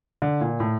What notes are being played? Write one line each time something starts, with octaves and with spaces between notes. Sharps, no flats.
D3
A#2
A2